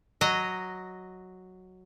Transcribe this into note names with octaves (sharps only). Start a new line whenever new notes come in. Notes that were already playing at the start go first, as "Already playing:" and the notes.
F#3 D#5